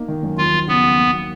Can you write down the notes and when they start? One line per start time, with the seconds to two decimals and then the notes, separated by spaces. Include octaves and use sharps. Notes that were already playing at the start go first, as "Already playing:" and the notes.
Already playing: A#3 D#4
0.08 D#3
0.23 F#2
0.38 D#2 F4
0.53 F3
0.67 C#3 B3
0.83 D#2
0.98 A#3
1.13 F#3